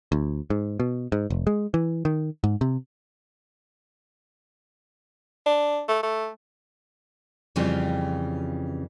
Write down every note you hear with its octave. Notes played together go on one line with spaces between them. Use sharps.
D2
G#2
B2
G#2
F1
G#3
E3
D#3
G#2
C3
D4
A3
A3
F2 C#3 E3 G3 C4 F4